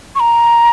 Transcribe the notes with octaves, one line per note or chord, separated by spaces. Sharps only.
C#6
A#5